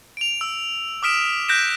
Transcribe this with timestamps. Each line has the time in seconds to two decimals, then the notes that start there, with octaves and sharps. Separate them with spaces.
0.17 D7 F7
0.41 E6
1.02 D6 D#6 F6 B6 D7 E7
1.48 F#6 G6 A#6 B6 D7 E7